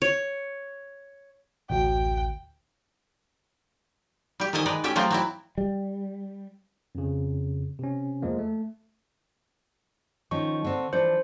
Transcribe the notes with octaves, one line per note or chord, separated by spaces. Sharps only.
C#5
A1 D2 F#4 G5
G3 G4
D#3 F3 A4 D#5 G#5
G#3 D#4 B4 D5
A3 C#4 G4 E5 G5
F3 F#3 A3 C4 F4 C5
F#3 C4 E4
G3
F2 C#3
C3 C#4
E2 F3 G#3 A#3
A3
D#3 F3 C#4 C#6
D3 C4 D4
E3 F3 D4 C5